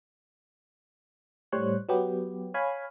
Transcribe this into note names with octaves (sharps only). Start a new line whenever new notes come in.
A2 G3 C5 C#5 F#6
F#3 B3 G4
C#5 F5 G#5 B5